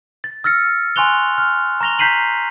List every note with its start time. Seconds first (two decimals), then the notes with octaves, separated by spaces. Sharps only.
0.24 A6
0.44 E6 F6 A6 A#6 C#7
0.96 G#5 C6 C#6 F#6 F7 G7
1.38 F6
1.81 A#5 C#6 A#6 F7 G7
1.99 A#5 G6 B6 C7 D#7 F#7